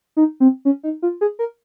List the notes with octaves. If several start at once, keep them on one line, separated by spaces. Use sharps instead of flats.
D#4
C4
C#4
D#4
F4
G#4
A#4